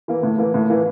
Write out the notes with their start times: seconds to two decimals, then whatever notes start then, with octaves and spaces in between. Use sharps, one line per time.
0.08 E3 A#3
0.23 A2
0.38 E3 A#3
0.54 A2
0.70 E3 A#3